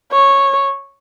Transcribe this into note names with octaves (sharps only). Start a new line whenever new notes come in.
C#5